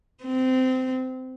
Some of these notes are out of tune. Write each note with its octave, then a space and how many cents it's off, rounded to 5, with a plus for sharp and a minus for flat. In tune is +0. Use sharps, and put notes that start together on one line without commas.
C4 -20